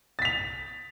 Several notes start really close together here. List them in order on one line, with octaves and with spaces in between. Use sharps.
A6 B6 F7